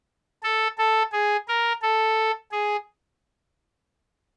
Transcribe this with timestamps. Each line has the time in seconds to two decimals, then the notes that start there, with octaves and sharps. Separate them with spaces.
0.43 A4
0.78 A4
1.12 G#4
1.48 A#4
1.82 A4
2.52 G#4